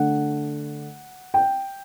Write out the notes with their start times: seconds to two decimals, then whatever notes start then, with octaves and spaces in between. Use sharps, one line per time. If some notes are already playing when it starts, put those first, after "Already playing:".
Already playing: D3 A3 D4 F#5
1.34 G5